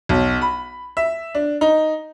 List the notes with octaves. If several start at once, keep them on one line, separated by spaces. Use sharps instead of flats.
B1
B5
E5
D4
D#4